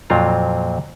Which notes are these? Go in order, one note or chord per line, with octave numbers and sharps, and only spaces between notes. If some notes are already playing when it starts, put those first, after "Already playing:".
F2 A#2 F#3 C4 F4 A#5